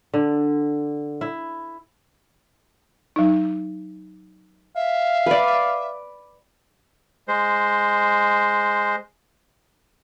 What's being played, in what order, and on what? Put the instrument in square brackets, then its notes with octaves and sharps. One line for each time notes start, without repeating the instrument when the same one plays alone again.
[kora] D3
E4
[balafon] F#3 D#4
[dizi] E5 [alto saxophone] F5
[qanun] B4 D5
[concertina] G#3 C5